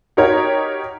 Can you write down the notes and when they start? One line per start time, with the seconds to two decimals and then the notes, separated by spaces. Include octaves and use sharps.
0.17 D#4 F#4 G4 A#4 C#5